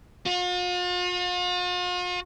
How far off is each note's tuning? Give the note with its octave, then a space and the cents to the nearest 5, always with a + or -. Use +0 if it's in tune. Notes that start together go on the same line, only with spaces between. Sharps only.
F4 +45